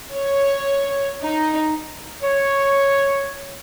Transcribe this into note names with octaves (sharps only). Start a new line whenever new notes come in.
C#5
D#4
C#5